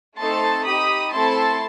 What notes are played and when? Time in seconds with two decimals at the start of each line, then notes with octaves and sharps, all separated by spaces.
0.19 A3 C4 D#4 A4 A5 C6
0.66 D#4 G4 B5 D#6
1.12 A3 C4 E4 A4 A5 C6